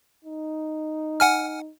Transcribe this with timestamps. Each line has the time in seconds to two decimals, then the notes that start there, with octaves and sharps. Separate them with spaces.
0.25 D#4
1.20 F#5 G#5 F6